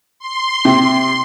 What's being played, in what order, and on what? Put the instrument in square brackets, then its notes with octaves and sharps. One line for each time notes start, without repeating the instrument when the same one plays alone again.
[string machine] C6
[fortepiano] C3